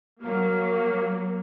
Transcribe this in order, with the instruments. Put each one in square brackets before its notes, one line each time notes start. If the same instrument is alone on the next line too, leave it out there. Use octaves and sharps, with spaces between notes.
[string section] F#3 A#3